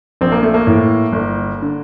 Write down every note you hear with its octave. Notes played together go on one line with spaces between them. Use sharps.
A#1 C4
A#3
A3
A#3
A2 E3
G1
D3